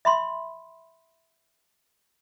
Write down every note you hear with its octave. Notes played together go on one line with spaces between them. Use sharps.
E5 B5 C6